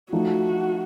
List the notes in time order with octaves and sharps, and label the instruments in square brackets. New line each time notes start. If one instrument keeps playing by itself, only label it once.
[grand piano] F3 A3 D#4 [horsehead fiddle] F#4